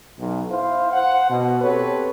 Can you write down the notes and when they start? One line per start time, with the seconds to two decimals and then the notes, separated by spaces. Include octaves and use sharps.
0.18 B1
0.50 E4 C5 F5
0.92 C5 F#5
1.30 B2
1.62 C4 G4 A4 B4 C#5